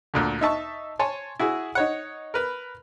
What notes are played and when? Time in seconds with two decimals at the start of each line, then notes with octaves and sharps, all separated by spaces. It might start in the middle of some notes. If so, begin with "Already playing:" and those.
0.14 D2 A#2 D3
0.41 D#4 E5 A5 C#6
0.99 C#5 G#5 A5 C6
1.40 E4 F#4 G#4
1.75 D#4 C#5 F#5
2.34 A#4 B4 B5